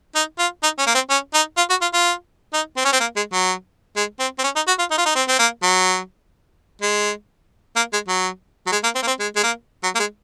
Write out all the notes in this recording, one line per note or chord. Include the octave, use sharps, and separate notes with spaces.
D#4
F4
D#4
C#4
A#3
C4
C#4
D#4
F4
F#4
F4
F4
D#4
C4
C#4
C4
A#3
G#3
F#3
G#3
C4
C4
C#4
D#4
F#4
F4
D#4
F4
D#4
C4
C4
A#3
F#3
G#3
A#3
G#3
F#3
F#3
G#3
A#3
C4
A#3
C4
G#3
G#3
A#3
F#3
A#3
G#3